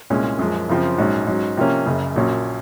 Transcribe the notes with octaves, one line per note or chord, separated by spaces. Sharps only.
C2 A#2 G#3 C#4
F#2 F3 G#3
F#2 C#3 F3 C4
A#1 G#2 F#3 C#4
G#2 F#3 C#4
C3 F3 A#3 C#4
F#1 F#2 C#3
A#1 A#2 F#3 C#4